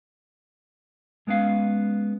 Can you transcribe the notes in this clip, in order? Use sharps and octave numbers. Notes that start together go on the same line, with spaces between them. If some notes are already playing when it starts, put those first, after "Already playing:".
G#3 B3 C#4 F5